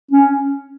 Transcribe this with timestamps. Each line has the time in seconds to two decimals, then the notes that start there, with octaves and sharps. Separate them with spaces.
0.11 C#4